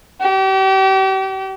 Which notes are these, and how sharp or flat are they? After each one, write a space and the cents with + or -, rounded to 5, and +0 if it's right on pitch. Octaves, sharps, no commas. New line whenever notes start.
G4 -35